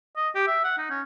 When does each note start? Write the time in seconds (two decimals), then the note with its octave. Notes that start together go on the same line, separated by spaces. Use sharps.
0.16 D#5
0.35 G4
0.47 E5
0.64 F#5
0.78 D#4
0.90 C#4